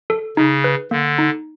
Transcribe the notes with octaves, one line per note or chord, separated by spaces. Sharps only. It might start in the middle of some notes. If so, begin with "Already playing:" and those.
A4
C#3 D#4
B4
D3 A#3
D#4